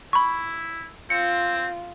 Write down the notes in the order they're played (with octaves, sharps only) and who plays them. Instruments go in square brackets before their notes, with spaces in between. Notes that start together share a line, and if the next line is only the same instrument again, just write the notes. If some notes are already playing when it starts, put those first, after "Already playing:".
[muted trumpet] E4 [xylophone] B5 C#6
[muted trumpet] C4 [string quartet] F4 [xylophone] C#7